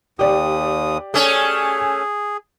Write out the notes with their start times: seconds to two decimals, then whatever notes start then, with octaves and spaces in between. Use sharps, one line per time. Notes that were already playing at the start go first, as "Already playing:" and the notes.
0.19 D#2 G4 D5 D#6
1.14 A3 C#4 G#4